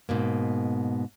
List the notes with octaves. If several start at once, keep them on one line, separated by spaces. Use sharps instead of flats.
G#2 B2 A#3